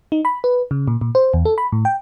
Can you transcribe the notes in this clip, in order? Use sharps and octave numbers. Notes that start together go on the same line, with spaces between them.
D#4
B5
B4
C#3
A#2
A#2
C5
E2
A4
B5
A2
G5